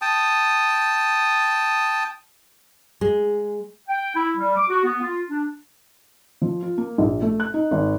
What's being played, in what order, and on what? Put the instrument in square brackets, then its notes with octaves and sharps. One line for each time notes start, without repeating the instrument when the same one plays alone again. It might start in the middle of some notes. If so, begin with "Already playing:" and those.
[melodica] G5 A5 D#6
[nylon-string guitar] G#3
[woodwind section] G5
E4
G3
D6
F#4
B3
F4
D4
[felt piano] F3
F4
A#3
A#1
A3
F#6
D#4
G#1